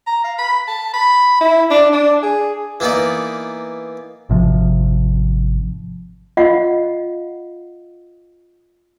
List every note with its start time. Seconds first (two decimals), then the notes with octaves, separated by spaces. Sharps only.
0.07 A#5
0.24 F5
0.39 B5
0.68 A5
0.94 B5
1.41 E4
1.70 D4
1.93 D4
2.22 G#4
2.80 E3 A#3 B3 D#4 D5
4.29 G#1 C3 F3
6.37 F4 D#5 F5 F#5